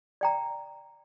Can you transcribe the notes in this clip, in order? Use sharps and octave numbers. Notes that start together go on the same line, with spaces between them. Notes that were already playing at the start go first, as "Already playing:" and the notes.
D5 G5 A#5